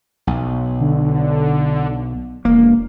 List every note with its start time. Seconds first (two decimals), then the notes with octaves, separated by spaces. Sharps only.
0.27 B1
0.81 D3
2.45 E1 A#3